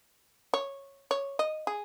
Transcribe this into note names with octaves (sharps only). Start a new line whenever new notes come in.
C#5
C#5
D#5
G#4